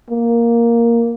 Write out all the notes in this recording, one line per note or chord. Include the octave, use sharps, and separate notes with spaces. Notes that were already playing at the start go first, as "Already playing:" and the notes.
A#3